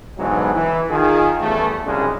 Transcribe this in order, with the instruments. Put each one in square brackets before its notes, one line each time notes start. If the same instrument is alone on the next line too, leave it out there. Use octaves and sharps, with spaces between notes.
[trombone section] G#2 B2 D3 E3 F#3 G#3
E3
D#3 F4 G#4
A1 E2 G2 E3 A3
C2 F#2 C#3 G#3 C#4 D4